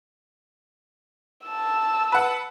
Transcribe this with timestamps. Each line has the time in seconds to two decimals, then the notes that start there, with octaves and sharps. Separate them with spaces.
1.46 A5 E6
2.12 B4 F#5